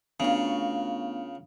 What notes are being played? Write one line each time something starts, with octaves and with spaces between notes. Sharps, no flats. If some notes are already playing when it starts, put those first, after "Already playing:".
C#3 A3 B3 D4 F4 F#4 A#4